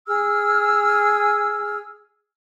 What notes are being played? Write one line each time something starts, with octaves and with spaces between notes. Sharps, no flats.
G#4 E6 F6